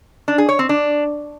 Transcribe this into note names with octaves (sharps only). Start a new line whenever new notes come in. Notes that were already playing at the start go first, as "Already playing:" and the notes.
D4
G#4
C#5
C4
D4